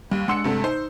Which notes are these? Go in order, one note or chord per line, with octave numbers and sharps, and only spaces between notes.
D#2 G3
G#3 D4 F#5 C6 E6 C#7
G2 C3 A3
D#4 C5